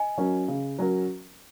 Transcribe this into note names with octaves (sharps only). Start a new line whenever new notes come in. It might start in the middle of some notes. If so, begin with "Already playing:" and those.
Already playing: D#5 G#5
F#3 C#4 A#4
C#3
F#3 C#4 A#4